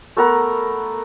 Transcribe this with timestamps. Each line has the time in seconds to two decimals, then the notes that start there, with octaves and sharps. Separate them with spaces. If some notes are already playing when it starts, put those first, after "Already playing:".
0.17 A3 B3 A#4 F#5